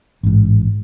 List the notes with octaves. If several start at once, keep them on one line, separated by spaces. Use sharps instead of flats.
A1 G#2